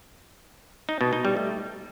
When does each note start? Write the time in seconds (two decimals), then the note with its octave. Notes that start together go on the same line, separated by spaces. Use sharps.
0.89 D#4
1.01 B2
1.13 D#4
1.25 G3
1.37 A3